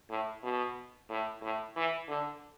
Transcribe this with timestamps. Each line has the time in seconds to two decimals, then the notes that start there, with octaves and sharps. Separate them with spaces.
0.10 A2
0.43 B2
1.10 A2
1.42 A2
1.76 E3
2.08 D3